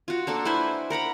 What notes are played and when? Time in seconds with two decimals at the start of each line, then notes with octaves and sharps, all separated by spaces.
0.08 F4 F#4
0.27 A#3 D4 A4
0.45 E4 B4 C5 G#5
0.90 A#4 F#5 A#5 B5